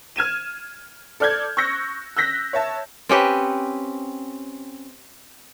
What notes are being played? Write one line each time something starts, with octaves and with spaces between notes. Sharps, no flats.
F6 G#6 D#7 E7
A4 D5 F6 G6 G#6
C#6 E6 F#6 G6 A#6 C#7
E6 F#6 G6 A#6 B6
C#5 E5 A5
C4 C#4 G4 B4